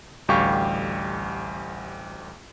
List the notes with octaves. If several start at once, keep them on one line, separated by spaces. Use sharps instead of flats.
A1 D2 G3 G4 F5 C#6